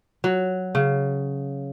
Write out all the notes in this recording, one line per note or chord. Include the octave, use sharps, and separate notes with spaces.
F#3
C#3